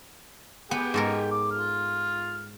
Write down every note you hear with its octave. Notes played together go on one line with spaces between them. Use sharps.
B3 G4 G#4 G5
G#2 A4 A#4
D6
F4 F6